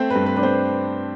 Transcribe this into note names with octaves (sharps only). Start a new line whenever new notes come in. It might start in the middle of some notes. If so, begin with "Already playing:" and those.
Already playing: A3 C4 C5
B4
G2
B4
D4 B4
C4 C5